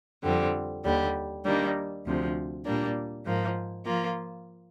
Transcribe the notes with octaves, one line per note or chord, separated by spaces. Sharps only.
F2 D3 G3 C4
D#2 D3 G3
D#3 G3 A#3 D4
D2 C3 F3
A#2 G3 A#3 D4
G#2 F3 A#3
F3 A#3 F4